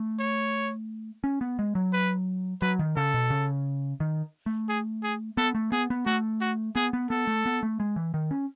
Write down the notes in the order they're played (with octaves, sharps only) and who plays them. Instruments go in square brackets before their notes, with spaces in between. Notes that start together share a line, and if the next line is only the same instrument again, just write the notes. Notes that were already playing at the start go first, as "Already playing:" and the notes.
Already playing: [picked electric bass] A3
[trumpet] C#5
[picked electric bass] C#4
B3
G#3
F#3
[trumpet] B4
[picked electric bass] F#3 [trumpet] B4
[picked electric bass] D#3
[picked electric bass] C#3 [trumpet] A4
[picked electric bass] B2
C#3
D#3
A3
[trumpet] G#4
G#4
[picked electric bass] B3 [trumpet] A4
[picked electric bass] A3
[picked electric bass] B3 [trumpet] G#4
[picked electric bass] B3
[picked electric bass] A3 [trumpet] F#4
[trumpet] F#4
[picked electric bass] B3 [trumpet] G#4
[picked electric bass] B3
[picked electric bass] B3 [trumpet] A4
[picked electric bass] A3
B3
A3
G#3
E3
D#3
C#4